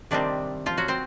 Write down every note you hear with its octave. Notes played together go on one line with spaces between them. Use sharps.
C3 D#3 G3 C4 D4
F3 F4
F#3 F#4
C4 C5